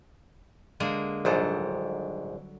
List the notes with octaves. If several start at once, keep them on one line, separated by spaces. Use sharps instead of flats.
D3 G#3 A#3
A#1 D#2 G#2 F#3 G3 A4